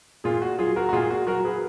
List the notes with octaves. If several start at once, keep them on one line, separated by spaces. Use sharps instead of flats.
A#2 F4 G#4
F#4
F#3 F4 G#4
F#4 A#4
F#4
A#2 F4 G#4
F#4
F#3 F#4 A#4
G#4 B4